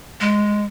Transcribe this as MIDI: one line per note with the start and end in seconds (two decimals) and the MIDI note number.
0.21 0.65 56